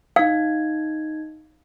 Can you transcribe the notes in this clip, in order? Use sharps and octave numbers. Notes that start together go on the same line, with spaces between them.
D#4 F5 G#6